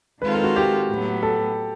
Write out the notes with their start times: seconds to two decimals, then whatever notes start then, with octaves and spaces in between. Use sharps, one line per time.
0.22 D#3 G#3 C4 F4 A4 B4
0.33 A#4
0.44 F#4
0.56 G4
0.89 A2 F#3 B3
1.23 A4